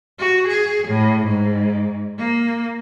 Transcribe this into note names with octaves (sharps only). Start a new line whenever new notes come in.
F#4
G#4
A2
G#2
A#3